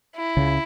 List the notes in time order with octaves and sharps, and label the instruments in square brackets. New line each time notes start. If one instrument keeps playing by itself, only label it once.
[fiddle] E4
[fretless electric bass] C#2 C#3